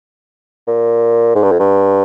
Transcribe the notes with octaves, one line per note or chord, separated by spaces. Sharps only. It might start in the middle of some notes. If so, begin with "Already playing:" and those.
A#2
G#2
G2
F2
G2